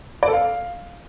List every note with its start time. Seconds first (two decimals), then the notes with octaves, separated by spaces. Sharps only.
0.23 D5
0.28 A4
0.33 F5